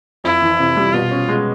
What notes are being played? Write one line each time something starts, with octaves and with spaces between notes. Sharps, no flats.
F2 E4
E3
C3
G3
B2 F4
C#4
G#3